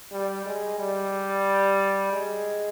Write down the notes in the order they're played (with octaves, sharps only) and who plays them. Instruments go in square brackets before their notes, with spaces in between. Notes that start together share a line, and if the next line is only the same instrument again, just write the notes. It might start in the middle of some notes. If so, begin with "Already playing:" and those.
[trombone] G3
G#3
G3
G#3